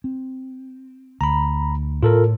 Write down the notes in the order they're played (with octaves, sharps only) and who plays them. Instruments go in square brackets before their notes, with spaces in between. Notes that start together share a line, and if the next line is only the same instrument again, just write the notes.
[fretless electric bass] C4
[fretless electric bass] D2 [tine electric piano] A#5 B5
[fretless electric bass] A2 [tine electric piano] F4 A4 A#4